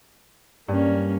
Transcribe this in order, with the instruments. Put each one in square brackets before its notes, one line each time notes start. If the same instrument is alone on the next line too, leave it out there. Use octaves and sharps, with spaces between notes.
[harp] G2 [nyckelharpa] A#3 C#4